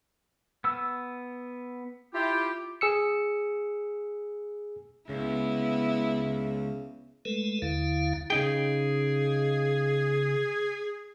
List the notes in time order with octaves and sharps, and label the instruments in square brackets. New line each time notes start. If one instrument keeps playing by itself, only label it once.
[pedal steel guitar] B3 E6
[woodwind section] E4 F4 G4
[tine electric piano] G#4 E6 C#7
[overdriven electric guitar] C#2 [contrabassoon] C#3 [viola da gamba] B3 E4
[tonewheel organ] G#3 A3 A4 B4
D#2 D3 E4 F5
[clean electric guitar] C#3 D#4 G5 [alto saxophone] G#4